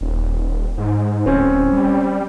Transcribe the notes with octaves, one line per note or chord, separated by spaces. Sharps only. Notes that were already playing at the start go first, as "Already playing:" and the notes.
D#1
G#2
D1 C4 C#4
G3